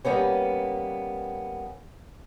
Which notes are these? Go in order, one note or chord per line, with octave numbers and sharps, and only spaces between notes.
G3 A#3 B3 C#4